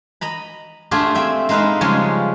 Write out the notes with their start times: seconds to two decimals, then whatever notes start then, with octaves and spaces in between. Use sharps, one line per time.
0.21 D#5 A#5 B5
0.91 A3 D4 F4 G4 G#4 E5
1.15 C4 E5 G5
1.49 G#3 C4 D#4 B4 E5 F5
1.81 C#3 F3 G3 G#3 C#4 F4